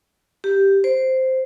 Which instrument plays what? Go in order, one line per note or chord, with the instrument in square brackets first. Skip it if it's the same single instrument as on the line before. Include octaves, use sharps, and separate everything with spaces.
[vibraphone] G4
C5